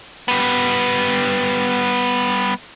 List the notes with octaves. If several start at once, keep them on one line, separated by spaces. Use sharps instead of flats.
G3 B3